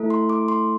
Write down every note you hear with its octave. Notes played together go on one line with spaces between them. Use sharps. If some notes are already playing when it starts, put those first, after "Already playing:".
Already playing: A3 E4 A4
C6
D6
C6